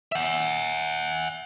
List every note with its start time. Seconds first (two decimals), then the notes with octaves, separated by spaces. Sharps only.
0.12 E5 F#5